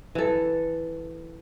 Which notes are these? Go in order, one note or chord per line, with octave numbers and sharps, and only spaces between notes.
E3 A4